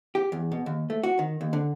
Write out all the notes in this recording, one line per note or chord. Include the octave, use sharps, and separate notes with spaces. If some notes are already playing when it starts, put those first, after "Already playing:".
G4
E2
B2
D#2
A3
F#4
D#3
D#2
D3